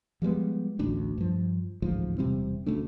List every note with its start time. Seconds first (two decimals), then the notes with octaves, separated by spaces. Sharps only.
0.22 F3 G3 G#3 B3
0.79 A1 D2 D4
1.18 G2 F3
1.82 A1 D2 G#2 F3
2.18 E1 C3 G3 C4
2.66 D2 C#3 A3 D4